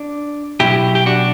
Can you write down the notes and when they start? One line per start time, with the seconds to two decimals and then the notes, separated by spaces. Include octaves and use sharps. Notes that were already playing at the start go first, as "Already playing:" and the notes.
Already playing: D4
0.60 B2 F#3 E4 G4
0.95 G4
1.06 D4 F#4